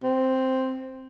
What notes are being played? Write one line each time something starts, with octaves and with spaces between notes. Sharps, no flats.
C4